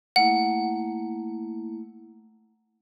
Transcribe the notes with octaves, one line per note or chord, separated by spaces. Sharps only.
A3 A#3 E4 F#5